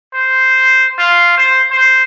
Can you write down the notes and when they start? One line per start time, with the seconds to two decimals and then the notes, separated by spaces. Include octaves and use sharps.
0.14 C5
0.99 F4
1.37 C5
1.71 C5